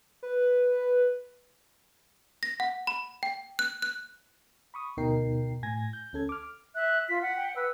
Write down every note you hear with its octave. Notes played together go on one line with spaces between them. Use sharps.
B4
A#6
F#5
B5
G5
F#6
F#6
B5 C#6 D#6
D2 B2 D#4 A#4 G5 C7
A2 G#5 G#6 A#6
G6
D2 C#4 A4 G#6
D6 F6
E5 F#6
F4 B6
F#5
G5
B4 E6